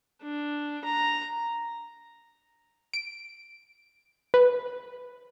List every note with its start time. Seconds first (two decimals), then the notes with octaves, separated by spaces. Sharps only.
0.23 D4
0.85 A#5
2.93 D7
4.34 B4